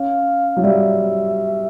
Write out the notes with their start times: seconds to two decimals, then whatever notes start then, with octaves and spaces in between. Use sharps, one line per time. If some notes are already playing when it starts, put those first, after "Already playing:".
Already playing: C#4 F5
0.57 F#3
0.64 G3 E5